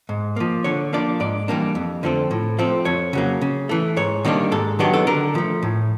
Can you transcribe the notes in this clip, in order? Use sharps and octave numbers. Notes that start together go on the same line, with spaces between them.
G#2
F3 A#3
D3 C#5
F3 A#3 D4 D5
G#2 D5
E3 G3 A#3 D4
F2
D3 F3 A3 C4
A2
F3 A3 C4
F2 C#5
C#3 F#3 A#3
C#3
E3 A3
G#2 C#5
D#3 G3 A#3 D4
G#2 A4
D#3 F#3 B3 D4 G4
A4
D3 A#4
F3 A3
A2